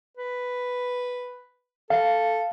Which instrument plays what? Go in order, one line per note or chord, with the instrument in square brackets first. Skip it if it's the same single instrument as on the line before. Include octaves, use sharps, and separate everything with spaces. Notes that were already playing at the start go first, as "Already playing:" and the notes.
[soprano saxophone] B4
[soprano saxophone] A4 [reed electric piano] F5